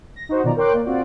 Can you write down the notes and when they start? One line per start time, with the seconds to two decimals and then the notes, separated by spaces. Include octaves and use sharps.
0.16 A#6
0.29 D#4 F#4 C5
0.44 B2 D#3 F3 D5 A#5
0.56 A#4 C#5 G5 C6 D6 F#6
0.73 A#3 D5
0.86 C4 F4 F#4 D5